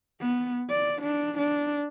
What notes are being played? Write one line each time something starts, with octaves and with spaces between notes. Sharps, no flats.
B3
D5
D4
D4